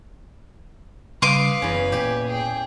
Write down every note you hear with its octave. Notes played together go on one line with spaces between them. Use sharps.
C#3 G3 C#4 B4 F5 C6 D6 D#6
F#1 E2 C#4
A#2 G4 G#5
G#4 G5